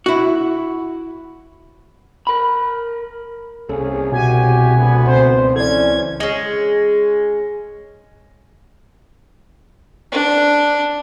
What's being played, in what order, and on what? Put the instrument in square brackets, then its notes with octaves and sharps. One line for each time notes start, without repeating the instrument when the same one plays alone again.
[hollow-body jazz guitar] E4 F#4
[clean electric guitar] A#4 B5
[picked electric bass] C2 [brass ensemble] A#3 C#4 G#4 [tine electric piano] A4
[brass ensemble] E2 F#4 G4 [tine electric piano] B2 [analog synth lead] G#5
[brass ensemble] D2 B3
[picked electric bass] C#2 C4 [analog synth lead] C5
[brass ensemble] E3 C#4 [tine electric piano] A4 D5 [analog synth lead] G#6
[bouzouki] G#3 C#4
[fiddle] D4